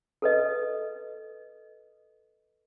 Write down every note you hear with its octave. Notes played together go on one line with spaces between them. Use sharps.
A4 B4 D#5